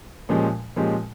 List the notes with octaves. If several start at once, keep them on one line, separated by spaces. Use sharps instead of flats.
A#2 F3 G#3 C#4 G4
A#2 F3 G#3 C#4 G4